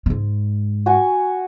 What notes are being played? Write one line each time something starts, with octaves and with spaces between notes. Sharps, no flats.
G#2 G#3
F#4 G#5 C#6